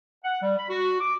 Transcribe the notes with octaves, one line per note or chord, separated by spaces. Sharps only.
F#5
G3
B5
F#4
D6